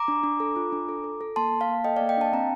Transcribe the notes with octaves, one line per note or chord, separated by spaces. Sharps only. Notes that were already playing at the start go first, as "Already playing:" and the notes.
Already playing: A#5 D6
D4
D4
A4
F4
D4
A4
A4
A4
A#3 A5 C6
A#3
F5 A5
A#3
A4 D#5 G5
A#3 D5 F5
D#5 G5
D4 F5 A5
C4 G5 A#5